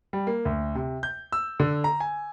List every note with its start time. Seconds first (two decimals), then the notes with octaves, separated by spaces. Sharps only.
0.13 G3
0.27 A#3
0.45 D2
0.75 C3
1.03 G6
1.32 E6
1.60 D3
1.84 A#5
2.00 G#5